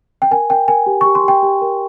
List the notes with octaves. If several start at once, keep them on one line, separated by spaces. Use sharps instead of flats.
G5
A#4 G#5
A#4 G5
A#4 G#5
G4
G4 C#6
C6
G4 G5
G4
A#4